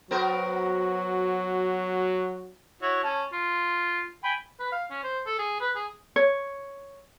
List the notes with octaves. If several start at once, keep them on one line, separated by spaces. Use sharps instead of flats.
F#3 B3 F#4 A#4 C5
E4 F#4 C#5
C#4 A5
F4
G5 G#5 B5
B4
F5
C#4
C5
A4
G#4
B4
G#4
C#5